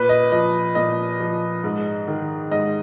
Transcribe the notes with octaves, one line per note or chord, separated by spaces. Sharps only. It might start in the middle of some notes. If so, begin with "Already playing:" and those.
Already playing: A#2 B4
D#5
F3 D#5
A#2 D#5
F3
G#2
D#3
G#2 D#5